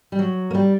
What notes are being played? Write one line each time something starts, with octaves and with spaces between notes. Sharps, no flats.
G3
F#3
A#3
G3